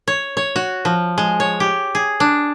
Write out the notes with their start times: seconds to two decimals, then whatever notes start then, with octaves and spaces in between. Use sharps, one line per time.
0.08 C#5
0.37 C#5
0.56 F#4
0.85 F3
1.18 G#3
1.40 C#5
1.60 G4
1.95 G#4
2.20 D4